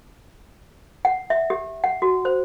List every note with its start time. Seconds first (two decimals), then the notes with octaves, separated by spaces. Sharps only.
1.05 F#5
1.30 E5
1.50 G4
1.84 F#5
2.02 F#4
2.25 C5